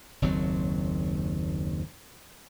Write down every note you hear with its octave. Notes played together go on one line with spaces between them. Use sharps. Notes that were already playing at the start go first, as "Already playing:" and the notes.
F#1 D#2 F#3 C4